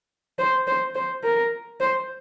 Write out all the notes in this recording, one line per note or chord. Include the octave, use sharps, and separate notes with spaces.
C5
C5
C5
A#4
C5